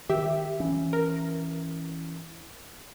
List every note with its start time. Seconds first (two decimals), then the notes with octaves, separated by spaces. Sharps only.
0.09 D#3 G4 E5
0.60 E3 C#4
0.93 A#4